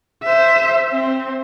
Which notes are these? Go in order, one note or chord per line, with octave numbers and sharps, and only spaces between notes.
C5 E5
C4